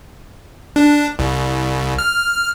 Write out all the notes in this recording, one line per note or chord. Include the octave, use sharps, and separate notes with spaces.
D4
C2
F6